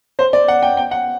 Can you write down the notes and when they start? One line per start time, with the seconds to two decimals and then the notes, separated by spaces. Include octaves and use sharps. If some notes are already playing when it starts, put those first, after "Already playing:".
0.19 C5
0.33 D5
0.48 F#5
0.62 G5
0.77 G5
0.91 F#5